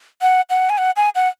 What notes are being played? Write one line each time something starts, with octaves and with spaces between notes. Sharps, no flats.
F#5
F#5
G#5
F#5
G#5
F#5